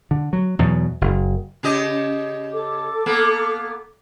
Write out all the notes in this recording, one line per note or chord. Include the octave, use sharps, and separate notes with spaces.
D3
F#3
E2 B2 F#3
F#1
C#3 G4 D#5
A4 D6
A#3 B3